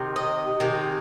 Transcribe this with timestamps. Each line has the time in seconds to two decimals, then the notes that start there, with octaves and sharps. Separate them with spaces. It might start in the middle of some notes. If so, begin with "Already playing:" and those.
Already playing: C3 D#3
0.16 D#5
0.60 C3 D#3 G#3